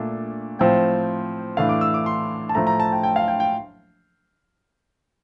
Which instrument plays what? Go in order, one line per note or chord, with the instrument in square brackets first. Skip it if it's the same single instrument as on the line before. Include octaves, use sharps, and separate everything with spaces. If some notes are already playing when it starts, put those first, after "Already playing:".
Already playing: [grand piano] A#2 A3 D4
A2 F3 C4 G5
A2 E3 A3 D4 F5
D6
E6
D6
C6
A5
A2 F3 A3 A#5
A#5
A5
G5
G5
F5
G5
G5